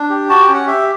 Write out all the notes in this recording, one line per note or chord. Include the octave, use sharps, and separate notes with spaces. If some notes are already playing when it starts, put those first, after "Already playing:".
Already playing: D4
G4
F#4 A5
G5
C#4
F#5
G4 E5